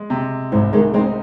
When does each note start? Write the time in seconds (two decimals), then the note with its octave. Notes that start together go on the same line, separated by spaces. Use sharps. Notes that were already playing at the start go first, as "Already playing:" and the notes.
Already playing: G#3
0.10 C3
0.52 C2 G#2
0.73 D#3 G#3
0.94 G#3 C4 D#4